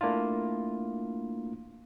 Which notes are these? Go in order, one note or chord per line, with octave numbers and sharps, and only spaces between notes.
A3 A#3 D4 E4 F4